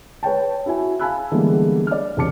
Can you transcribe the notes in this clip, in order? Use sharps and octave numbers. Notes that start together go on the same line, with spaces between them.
B4 C#5 G5 A5
E4 F#4 E5 G#5
F5 G#5 A5 B5 E6 F#6
D3 E3 G3 G#3 A#3 B3
D5 F6
E1 C2 D4 A5 D6 C#7